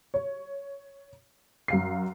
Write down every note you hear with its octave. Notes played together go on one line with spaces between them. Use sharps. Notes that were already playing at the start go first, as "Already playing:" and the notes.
C#5
F#2 F5 C7